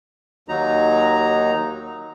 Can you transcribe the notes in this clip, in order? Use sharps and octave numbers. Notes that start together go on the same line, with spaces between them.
D#2 F#3 D#4 A#5